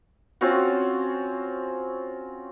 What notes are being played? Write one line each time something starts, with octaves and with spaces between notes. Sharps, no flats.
C4 C#4 F4 F#4